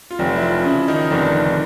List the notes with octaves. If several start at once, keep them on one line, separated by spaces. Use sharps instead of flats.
F4
F1 F#3 F#4
E4
F3 F4
C#3 E3 E4
D4
D#3 D#4
F1 D3 D4